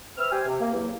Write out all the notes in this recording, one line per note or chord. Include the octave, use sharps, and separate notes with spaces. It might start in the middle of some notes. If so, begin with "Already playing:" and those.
C4 B4 E5 E6 F6
G4 C5 G#5
C3
A#3
E2 F#3 A#3